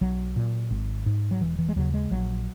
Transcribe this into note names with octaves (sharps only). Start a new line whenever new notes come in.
B1 F#3
A#2
G#1
G#2
F#3
E1 E3
E3
G#3
D#2 C#3 F#3
G#3
A#1 F#3